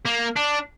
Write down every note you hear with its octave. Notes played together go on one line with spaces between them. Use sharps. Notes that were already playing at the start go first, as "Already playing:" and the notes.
A#3
D4